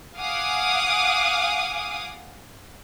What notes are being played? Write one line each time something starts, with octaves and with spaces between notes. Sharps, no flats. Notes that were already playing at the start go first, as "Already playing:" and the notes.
F5 F#5 G#5 D6 D#6